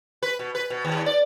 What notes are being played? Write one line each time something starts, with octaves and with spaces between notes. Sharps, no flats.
B4
B2
B4
B2
D#2
D5